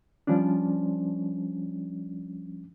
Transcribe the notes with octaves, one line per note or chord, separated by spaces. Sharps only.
F3 G3 C#4 D4